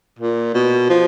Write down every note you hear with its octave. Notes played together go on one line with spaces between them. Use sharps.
A#2
B2
F3